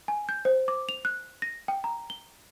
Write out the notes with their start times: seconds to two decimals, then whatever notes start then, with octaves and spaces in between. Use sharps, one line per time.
0.08 G#5
0.29 G6
0.45 C5
0.68 D6
0.89 F7
1.05 F#6
1.42 A#6
1.68 G5
1.84 A#5
2.10 G7